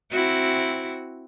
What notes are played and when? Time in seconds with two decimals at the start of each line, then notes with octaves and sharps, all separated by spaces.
0.11 C4 E4 F#4